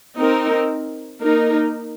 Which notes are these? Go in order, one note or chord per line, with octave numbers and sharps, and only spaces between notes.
C4 D#4 A#4
A#3 D#4 A#4